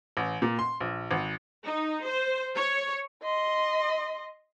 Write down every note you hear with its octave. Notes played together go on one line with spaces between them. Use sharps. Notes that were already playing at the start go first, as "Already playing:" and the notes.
A1
A#2
C6
A#1
G#1
D#4
C5
C#5
D#5 C6